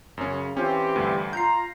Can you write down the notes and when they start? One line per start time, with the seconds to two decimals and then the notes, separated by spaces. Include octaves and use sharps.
0.17 F#2 C#3 C#4
0.57 E3 C4 C#4 F4 G4
0.96 D2 G2
1.33 F4 A#5 G6 C7